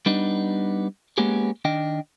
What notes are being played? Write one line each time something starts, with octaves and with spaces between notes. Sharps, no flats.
G3 B3 D4 D#4
G#3 A#3 B3 C#4 G4 G#4
D#3 D4 D#5 G5